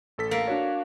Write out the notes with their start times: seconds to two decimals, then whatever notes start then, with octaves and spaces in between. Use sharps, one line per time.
0.18 A1 A4 B6
0.31 A#3
0.48 D4 F#4 C#5